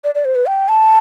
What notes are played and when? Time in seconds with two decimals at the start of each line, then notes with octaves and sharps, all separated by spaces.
0.04 D5
0.15 D5
0.25 C5
0.35 B4
0.46 G5
0.69 A5